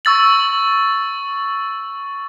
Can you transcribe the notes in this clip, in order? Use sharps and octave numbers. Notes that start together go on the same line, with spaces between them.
C#6 E6 A6 F#7